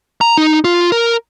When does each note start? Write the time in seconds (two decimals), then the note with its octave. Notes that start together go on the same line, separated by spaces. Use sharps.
0.21 A#5
0.38 D#4
0.64 F4
0.92 A#4